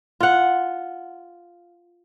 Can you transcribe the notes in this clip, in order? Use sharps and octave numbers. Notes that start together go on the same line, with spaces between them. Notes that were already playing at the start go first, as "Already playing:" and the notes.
F4 F#5